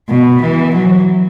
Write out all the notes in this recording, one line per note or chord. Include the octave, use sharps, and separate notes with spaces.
B2
E3
F#3